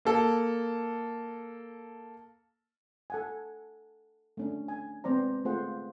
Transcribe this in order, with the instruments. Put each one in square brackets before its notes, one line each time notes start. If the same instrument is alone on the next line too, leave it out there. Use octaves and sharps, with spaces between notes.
[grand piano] A#3 A4
[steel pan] A4 F#5 G#5
A3 C#4 D4
G#5
G#3 B3 C4 C5 D5 A#5
A3 F4 G#4 C5 F#5